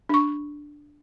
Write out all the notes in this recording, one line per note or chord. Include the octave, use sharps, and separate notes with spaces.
D4 C#6